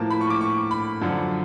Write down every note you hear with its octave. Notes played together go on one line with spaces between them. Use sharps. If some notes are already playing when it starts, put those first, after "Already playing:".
Already playing: A2 F3 A#3 A5
B5
C#6
D6
C#6
B5
F#2 D3 F3